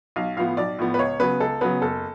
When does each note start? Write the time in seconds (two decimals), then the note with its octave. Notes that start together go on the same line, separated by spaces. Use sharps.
0.16 B1 F5
0.37 A2 F3 B3 F5
0.57 B1 D5
0.79 A2 F3 B3
0.94 B4
0.99 C#2 C#5
1.20 C#3 F#3 B3 B4
1.40 C#2 A4
1.61 C#3 F#3 B3 B4
1.82 F#1 A4